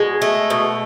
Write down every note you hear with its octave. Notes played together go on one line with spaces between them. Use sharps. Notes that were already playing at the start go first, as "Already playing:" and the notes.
Already playing: B2 G#3
A3
B2